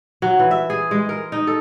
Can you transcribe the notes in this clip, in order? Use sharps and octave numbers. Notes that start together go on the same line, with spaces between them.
F#3
E3
E5
G#4
G#3
A#4
D#4
A4